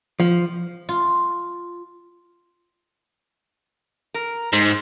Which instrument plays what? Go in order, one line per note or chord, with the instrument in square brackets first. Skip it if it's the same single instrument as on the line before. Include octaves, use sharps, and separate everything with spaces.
[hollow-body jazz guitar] F3
[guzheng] F4
[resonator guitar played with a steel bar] A#4
[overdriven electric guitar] G#2 [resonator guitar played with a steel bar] C5